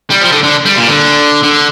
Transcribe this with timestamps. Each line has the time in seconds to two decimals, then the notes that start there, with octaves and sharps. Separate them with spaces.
0.10 G3
0.21 F3
0.32 D3
0.43 D3
0.65 G3
0.77 A#2
0.88 D3
1.43 D3